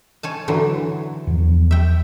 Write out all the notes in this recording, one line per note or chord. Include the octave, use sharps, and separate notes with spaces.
C#5 G#5 A5
D3 E3 F#3
E2 F3
E5 G5